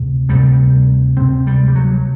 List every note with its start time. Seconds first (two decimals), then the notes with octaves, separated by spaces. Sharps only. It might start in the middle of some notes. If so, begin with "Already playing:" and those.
Already playing: D2 C3
0.29 D2 C3 G3
1.17 D2 C3 C4
1.47 G3
1.68 G3
1.75 F#3